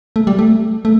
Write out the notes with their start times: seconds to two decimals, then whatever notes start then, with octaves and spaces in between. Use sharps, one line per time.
0.16 A3
0.27 G3
0.39 A3
0.85 A3